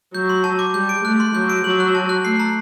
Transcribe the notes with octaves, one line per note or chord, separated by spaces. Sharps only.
F#3 G6
C6
A5
D6
G3 G6
D7
A3 F#6
C6
F#3 G6
D7
F#3 F#7
F#6
A5
F#6
A3 C7
A#5